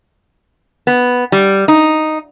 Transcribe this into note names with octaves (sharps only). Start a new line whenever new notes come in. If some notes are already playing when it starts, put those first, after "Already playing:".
B3
G3
D#4